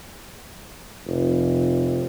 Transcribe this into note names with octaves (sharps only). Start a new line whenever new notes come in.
F1